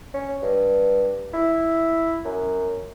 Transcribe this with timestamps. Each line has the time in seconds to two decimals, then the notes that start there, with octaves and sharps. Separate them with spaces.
0.14 C#4
0.42 G2
1.34 E4
2.25 F#2